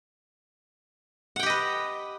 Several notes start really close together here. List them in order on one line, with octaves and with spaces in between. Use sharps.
F#5 G5 G4 D#5 B4